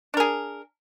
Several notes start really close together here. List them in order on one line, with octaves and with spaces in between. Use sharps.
D4 A#4 G#4